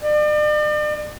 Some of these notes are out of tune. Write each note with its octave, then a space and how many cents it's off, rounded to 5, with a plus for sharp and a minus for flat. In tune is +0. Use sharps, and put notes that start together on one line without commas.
D5 +40